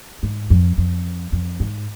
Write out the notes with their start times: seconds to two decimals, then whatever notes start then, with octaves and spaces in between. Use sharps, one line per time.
0.23 G#2
0.50 F2
0.78 F2
1.32 F2
1.60 G#2